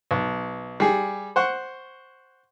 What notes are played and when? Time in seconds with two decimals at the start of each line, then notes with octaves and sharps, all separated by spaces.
0.11 B1
0.80 G3 G#4
1.36 C5 F#5 C#6